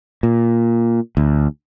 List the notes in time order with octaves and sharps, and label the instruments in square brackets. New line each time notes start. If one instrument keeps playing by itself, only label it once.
[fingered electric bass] A#2
D2